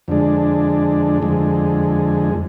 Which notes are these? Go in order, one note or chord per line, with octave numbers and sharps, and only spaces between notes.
F2 D3 G#3 D4
F2 D3 G#3